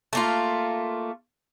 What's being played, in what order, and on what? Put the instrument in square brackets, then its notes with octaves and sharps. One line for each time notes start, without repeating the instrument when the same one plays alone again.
[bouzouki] A3 A#3 F4